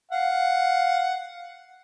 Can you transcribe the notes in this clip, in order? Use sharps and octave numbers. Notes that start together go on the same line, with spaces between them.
F5 F#5